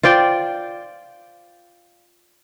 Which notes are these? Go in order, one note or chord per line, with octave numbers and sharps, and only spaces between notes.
F4 C5 D5 G5